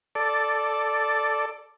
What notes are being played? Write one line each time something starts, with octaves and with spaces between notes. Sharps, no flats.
A4 D5